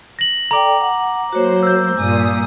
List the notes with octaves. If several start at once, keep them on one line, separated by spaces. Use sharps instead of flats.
A#6 F#7
A4 D5 G5 A#5 D6
F#5
F#3 A#3 F#4 C5 C#5
E6 G6
G2 A#2 G#5 D#6